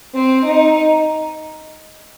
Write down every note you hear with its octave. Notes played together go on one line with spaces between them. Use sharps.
C4
D#4